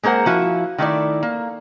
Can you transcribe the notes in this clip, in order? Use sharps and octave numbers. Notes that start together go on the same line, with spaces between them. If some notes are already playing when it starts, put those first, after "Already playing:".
G#3 A#3 A#4 C5 F#5
F3 E4 F#4
D#3 A3 E4 D5
A#3